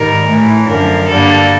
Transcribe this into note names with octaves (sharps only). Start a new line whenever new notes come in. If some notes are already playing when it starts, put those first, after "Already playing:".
Already playing: G#2 D#3 G3 A#4
A2 E3 A3
F#2 D3 F3 A#4
G2 D3 G3 A#3 A4